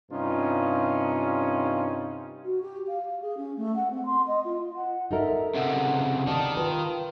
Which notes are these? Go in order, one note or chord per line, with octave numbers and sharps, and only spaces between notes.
G2 C3 C#4 D#4 F4
F#4
G4
F5
G#4
C#4
A3
F#5
C4
C6
D#5
F4
F#5
D#4 A4 A#4 E5
C#2 C3 F#5
D#3 D5 A5
F4 B4